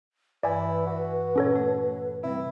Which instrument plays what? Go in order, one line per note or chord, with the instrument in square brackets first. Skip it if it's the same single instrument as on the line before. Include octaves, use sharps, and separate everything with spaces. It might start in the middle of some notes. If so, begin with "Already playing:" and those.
[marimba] G2 E3 [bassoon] E4 [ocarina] B4 [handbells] D5 G#5
[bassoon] F#4
[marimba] A#2 [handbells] C#4 A4 C#5
[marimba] A3
[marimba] C3 G3 [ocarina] C4 [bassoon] E4